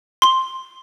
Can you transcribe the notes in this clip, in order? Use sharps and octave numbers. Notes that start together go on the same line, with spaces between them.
C6 G7